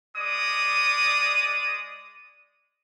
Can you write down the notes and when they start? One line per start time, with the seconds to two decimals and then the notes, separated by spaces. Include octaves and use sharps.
0.17 G#3 D5 D#6